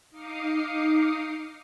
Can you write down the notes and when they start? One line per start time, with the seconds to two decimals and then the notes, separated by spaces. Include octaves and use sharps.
0.11 D#4 F5 D6 D#6 C7 C#7